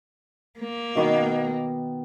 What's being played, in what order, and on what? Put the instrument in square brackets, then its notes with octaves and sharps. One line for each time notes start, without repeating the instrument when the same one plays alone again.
[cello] A#3
[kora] B2 D#3 B3